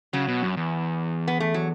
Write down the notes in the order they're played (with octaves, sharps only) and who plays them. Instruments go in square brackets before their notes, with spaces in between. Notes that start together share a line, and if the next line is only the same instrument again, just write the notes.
[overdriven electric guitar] C#3 [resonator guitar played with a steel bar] F#3
[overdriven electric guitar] B2
F#2
E2
[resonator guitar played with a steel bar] B3
A3
F#3